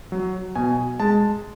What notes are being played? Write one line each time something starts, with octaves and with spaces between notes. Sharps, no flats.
F#3
B2 G#5
G#3 A5